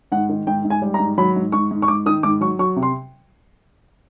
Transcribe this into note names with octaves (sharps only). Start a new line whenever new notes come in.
G#2 F#5
D#3
G#2 G5
G#2
G#5
G3
A#5
G#2
F#3 B5
G#2
G#2 C#6
G#2
C#6
G#2 D6
D#3 D#6
G#2 D6
F#3 C#6
F#3 C#6
C3
C6